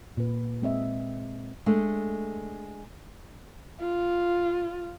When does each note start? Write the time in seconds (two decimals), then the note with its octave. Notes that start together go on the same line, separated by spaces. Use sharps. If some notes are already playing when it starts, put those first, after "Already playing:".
0.17 A#2 B4
0.62 G#3 C4 D#5 E5
1.66 G#3 A3 D4
3.81 F4